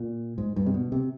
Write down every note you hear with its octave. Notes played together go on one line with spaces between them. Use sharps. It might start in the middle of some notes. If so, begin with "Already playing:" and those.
Already playing: A#2
G#2
G2
C3
B2
C3